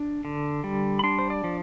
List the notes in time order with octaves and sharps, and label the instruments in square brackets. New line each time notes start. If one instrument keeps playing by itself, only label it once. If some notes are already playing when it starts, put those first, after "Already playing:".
Already playing: [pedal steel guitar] D4
D3
G3
B5
D4 C6
C5
D5
F3